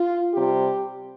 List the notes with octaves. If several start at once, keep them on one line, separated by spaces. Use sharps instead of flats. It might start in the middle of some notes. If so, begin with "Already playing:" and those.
Already playing: F4
C3 G3 G4